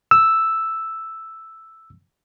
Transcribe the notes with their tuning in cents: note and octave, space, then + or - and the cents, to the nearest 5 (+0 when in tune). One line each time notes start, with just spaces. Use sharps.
E6 +0